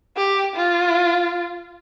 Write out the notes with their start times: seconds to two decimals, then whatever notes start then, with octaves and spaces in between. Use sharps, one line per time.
0.17 G4
0.56 F4